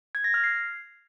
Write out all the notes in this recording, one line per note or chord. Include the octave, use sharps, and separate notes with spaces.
G#6
A#6
F6
C7